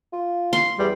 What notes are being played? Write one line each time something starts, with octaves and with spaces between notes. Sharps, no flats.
F4
C6
E2 G3